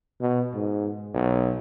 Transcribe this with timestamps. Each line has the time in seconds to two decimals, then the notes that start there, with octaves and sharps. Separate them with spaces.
0.21 B2
0.54 G#2
1.14 B1